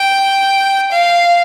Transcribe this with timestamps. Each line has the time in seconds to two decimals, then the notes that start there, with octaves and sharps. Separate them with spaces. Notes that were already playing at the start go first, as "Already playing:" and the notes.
Already playing: G5
0.91 F5